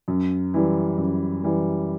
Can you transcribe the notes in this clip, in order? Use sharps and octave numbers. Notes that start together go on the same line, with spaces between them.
F#2
E3 G3
F#2
E3 G3